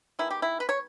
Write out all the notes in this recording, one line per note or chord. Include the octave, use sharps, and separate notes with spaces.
D#3 G#3 B3 E4
G4
E4
B4
C#5